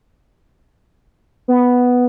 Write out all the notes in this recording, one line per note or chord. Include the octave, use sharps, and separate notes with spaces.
B3